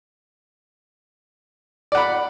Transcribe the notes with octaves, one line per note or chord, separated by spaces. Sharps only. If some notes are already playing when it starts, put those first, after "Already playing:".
D5 F#5 B5